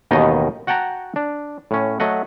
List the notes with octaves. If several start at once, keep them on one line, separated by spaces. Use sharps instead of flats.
A1 D#2 B2 D#3 D#4 D#5
F#4 F#5 G5 A5 A#5
D4
A2 C#4
F#3 A3 D#5 F#5